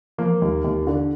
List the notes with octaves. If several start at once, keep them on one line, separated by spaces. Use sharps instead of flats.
F3 A#3
D#2
D#2
D3